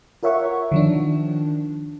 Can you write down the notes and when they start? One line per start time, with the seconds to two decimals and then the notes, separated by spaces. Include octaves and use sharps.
0.23 F4 A#4 C#5 E5 F#5 C#6
0.72 D#3 F3 D4